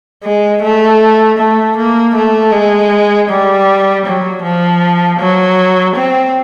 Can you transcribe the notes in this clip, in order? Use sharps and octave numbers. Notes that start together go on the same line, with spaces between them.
G#3
A3
A3
A#3
A3
G#3
G3
F#3
F3
F#3
C4